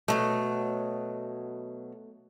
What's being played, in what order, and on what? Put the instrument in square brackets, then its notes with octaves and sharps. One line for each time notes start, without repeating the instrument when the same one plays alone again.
[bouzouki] B2 F3 F#3 [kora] A3